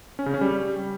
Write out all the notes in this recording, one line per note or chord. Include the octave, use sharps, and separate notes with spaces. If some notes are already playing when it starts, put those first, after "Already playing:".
C#4
C#3
C#4
G3